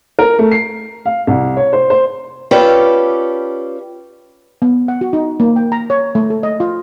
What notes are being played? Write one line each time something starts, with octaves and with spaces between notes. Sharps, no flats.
A#4
A3
C7
F5
C2
C#5
C5
C5
C#4 F4 G4 A4 B4 D5
B3
F#5
F#4
D#4
A#3
G5
A#5
C#5
A3
A4
D#5
F4